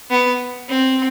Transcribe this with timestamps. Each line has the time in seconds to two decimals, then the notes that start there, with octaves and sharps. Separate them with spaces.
0.11 B3
0.69 C4